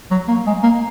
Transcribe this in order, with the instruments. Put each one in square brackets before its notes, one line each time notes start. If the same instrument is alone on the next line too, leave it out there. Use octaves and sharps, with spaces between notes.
[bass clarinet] F#3
A#3
G#3
A#3